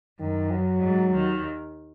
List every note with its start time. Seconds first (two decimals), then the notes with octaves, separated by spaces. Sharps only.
0.20 F#2 D#3
0.51 F#3
0.83 G#2
1.14 D#2 D#3